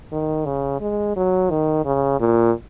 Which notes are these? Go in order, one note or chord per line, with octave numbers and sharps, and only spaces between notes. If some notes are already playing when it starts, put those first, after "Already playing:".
D#3
C#3
G#3
F#3
D#3
C#3
A#2